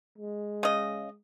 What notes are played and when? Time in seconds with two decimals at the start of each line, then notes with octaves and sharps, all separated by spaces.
0.18 G#3
0.63 C#3 D#5